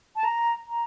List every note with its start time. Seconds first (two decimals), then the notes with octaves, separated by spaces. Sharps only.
0.16 A5
0.24 A#5
0.67 A#5